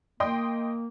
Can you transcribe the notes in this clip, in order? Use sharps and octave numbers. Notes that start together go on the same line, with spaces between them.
A#3 D#5 G5 C6